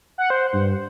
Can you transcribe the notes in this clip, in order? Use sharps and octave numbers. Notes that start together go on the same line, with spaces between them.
F#5
C5
G2